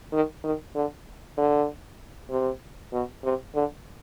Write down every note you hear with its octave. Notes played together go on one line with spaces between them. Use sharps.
D#3
D#3
D3
D3
C3
B2
C3
D3